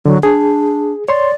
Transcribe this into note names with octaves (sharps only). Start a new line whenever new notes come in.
D3 F#3
D4 G#4
C#5 D5 C6